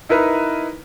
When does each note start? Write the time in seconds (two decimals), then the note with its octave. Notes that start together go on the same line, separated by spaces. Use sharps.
0.09 D#4 E4 A#4 B4